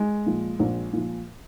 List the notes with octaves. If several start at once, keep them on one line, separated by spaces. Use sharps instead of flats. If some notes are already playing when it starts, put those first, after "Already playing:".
Already playing: G#3
A#2 F3
A#1
A#2 F3